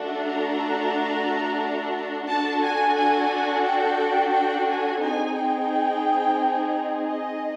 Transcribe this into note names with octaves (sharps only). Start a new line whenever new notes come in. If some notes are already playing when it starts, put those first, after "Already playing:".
Already playing: A3 D4 F#4 A4
A#5
D4 F#4 A4 A5
G#5
G#5
G5
G5
G#5
C4 D#4 G#4 G#5
G5
D#5